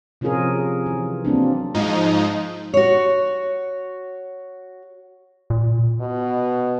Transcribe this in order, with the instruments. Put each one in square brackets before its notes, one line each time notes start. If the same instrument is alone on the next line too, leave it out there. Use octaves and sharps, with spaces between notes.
[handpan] C3 F3 C#4 F4 G#4 A#4
E3
F#3 A#3 C4 D4
[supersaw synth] G#2 F3 D#4
[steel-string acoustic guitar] F#4 C#5
[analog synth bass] A#2
[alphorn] B2